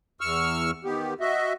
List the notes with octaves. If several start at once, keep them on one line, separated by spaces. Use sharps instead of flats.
E2 C#6 E6 F6
D#3 B3 G4
F#4 D#5 E5